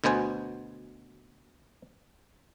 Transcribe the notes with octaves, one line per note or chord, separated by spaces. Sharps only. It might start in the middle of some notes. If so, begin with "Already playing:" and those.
D2 B2 B3 C5 G#5